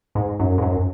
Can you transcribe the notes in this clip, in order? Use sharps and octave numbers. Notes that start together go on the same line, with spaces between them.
G#2
F#2
G#2
F#2